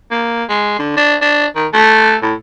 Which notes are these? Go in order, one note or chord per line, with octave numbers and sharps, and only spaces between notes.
A#3
G#3
D3
D4
D4
D#3
A3
A2